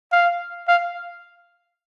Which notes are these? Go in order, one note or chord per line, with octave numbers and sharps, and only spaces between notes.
F5
F5